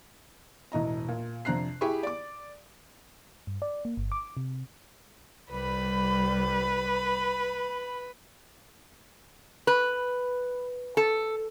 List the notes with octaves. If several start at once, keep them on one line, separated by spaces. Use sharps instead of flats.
E1 A2 D#5 A#5
A#2
F2 C3 D4 A#5 F#6 C7
E4 G4 G#4 G#5 B5 C#6
D5 D6
G2
D5
A#3
G1
D6
C3
C2 G3 B4 B5
B4
A4